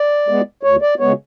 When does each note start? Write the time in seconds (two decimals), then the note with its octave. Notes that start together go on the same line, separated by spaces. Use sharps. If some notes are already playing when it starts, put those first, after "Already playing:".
Already playing: D5
0.28 G#3 B3
0.63 D2 C#5
0.82 D5
0.99 C#3 G#3 B3 C#5